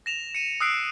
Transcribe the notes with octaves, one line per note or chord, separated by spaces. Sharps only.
A#6 E7 F7
C#7 D#7
D#6 E6 F#6 C7 D7